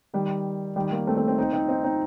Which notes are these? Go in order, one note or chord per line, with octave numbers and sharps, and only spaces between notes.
D#3 G3
D#3 G3
G3 A#3
A3 C4
A3 C4
C4 D#4
C4 D#4
C4 D#4
C4 D#4
C4 D#4